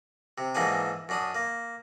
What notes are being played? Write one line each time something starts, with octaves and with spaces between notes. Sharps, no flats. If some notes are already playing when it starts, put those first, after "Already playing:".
C3
G#2 E3 A#3 B3 D4 G#5
F#2 D4 D#6
A#3